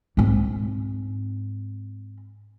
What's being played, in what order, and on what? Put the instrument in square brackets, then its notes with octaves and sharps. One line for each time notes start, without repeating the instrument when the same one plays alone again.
[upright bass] G#2 C4